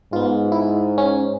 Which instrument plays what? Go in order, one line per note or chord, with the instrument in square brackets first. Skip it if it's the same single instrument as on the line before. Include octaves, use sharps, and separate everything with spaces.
[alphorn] G#2 [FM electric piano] B3 F4
[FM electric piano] E4
C#4